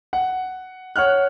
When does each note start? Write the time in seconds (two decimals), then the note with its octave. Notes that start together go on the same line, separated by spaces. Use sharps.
0.13 F#5
0.96 C#5 F#5 F6 F#6